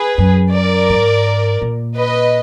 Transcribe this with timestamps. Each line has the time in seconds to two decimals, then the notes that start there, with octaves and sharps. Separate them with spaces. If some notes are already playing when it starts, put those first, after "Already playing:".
Already playing: G#4 B4
0.18 F#2
0.53 A#4 D5
0.89 G#2
1.61 A#2
1.96 B4 D#5